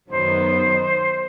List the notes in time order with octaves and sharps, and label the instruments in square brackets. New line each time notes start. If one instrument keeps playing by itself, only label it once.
[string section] F#2 D#3 F#3 B3 [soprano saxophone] C5